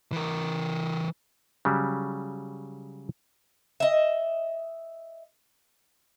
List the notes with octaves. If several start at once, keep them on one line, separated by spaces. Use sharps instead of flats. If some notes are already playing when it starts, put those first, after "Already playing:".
E3 A#4
C#3 F#3 G3
D#5 E5